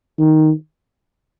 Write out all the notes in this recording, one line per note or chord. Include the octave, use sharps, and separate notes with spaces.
D#3